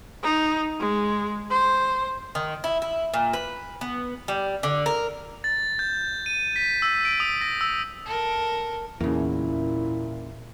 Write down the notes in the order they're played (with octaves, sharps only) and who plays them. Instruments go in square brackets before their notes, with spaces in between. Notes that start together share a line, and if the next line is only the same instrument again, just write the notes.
[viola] D#4
G#3
C5
[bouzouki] D#3
E4
E4
A#2
B4
B3
G3
D3
A#4
[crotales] A6
G6
D#7
B6
E6
D7
D#6
A#6
E6
[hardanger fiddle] A4 A#4
[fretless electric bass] E2 [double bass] A#2 [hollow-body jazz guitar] C#3 A#3 [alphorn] E4